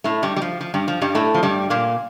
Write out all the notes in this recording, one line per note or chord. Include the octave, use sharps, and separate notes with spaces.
A2 A3
G2 G3
G3
F3
F3
G2 G3
F3
G2 G3
A2 A3
F3
G2 G3
A#2 A#3